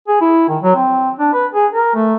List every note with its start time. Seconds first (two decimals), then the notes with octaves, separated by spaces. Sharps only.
0.08 G#4
0.21 E4
0.49 D#3
0.62 F#3
0.75 C4
1.19 D4
1.33 B4
1.54 G#4
1.72 A#4
1.95 A3